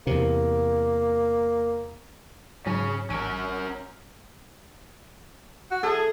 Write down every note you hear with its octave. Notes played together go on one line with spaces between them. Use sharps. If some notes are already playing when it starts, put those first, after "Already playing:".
E2 C3 A#3
G#2 C#3 F#3 C#4
A1 C#4 A#4 E6 D7
F#4
G#4 A4